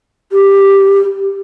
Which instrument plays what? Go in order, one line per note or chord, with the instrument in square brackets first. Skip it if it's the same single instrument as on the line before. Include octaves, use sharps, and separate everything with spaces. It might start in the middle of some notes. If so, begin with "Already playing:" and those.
[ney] G4